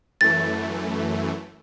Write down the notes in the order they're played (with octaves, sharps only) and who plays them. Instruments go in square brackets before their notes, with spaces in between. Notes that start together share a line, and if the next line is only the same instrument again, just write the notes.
[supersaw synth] F#2 E3 A3 [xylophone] A6